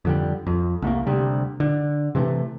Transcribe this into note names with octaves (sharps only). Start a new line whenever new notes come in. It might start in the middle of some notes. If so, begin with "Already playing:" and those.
F2 D3 G3
F2
C2 A3 A#3
D2 C3 G3
D3
C3 E3 F#3 A3